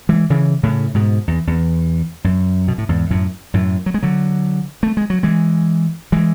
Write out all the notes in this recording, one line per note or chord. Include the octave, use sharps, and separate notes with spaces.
E3 G#3
C#3 E3
A2 C#3
G#2 B2
E2
E2
F#2
B2
A2
E2 G#2
F#2 A2
F#2 A2
F#3
G#3
D3 F#3
A3
G#3
F#3
E3 G#3
E3 G#3